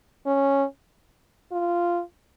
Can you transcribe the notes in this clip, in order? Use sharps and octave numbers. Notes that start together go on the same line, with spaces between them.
C#4
F4